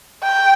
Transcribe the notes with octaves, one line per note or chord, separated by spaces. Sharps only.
G5